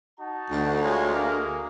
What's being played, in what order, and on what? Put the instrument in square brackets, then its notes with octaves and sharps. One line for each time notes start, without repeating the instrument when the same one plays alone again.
[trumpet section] D#4 F#4 A5
[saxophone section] D2
[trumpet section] G#3 F4 C#5
A#3 G#4 A#4